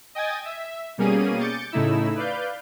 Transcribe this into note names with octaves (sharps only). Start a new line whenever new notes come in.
D#5 G5 G#5 D#6 G#6 A6
E5
B2 G3 A#3 C#4 G#4 D#7
D6 G6 A6 C#7
A2 C#3 A3 D#4 E4 E6
B4 D5 F5 G6